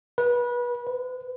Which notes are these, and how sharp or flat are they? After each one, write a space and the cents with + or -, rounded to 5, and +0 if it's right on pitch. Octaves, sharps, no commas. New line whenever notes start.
B4 -25
B4 +40